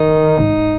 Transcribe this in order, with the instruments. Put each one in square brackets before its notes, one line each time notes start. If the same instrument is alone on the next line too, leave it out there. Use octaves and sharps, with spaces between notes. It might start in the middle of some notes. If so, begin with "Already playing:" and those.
Already playing: [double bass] D#3 [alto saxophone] D#4
[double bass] G#2